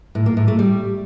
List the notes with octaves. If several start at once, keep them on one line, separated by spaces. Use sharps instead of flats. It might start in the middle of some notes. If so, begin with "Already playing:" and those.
A2
A#3
A2
A3
G3